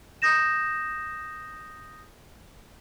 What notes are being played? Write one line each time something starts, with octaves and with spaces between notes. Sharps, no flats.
D#6 G6 A#6 E7